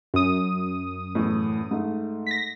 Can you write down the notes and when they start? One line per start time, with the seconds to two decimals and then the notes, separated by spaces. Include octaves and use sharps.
0.14 F#2 D#6
1.15 E2 A2
1.71 G#2 A3
2.27 A#6 B6